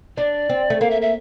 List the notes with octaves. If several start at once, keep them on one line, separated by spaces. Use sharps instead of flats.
D4 D5
C4
A3
A#3 F5
E5
E5